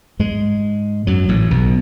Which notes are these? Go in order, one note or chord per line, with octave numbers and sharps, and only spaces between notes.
G#2 G#3
F#2 F#3
A1 A2
B1 B2